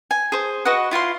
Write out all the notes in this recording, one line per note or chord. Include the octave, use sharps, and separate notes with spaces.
G#5
G#4 C5
F#4 B4 D#5 F#5
E4 F4 F5 C6